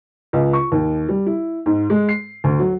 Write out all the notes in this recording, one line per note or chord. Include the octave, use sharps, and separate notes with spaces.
C#2
C#6
D#2
G3
E4
G#2
G#3
C7
D2
F#3